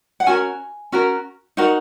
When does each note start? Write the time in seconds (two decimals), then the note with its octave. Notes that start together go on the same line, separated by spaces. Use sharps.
0.20 F#5
0.26 C#4 F#4 A#4 G#5
0.92 C#4 F#4 A#4
1.57 D#4 F#4 A#4 F#5